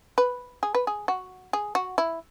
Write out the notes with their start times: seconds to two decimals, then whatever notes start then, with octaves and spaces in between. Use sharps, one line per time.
0.18 B4
0.63 G#4
0.75 B4
0.87 G#4
1.08 F#4
1.53 G#4
1.75 F#4
1.98 E4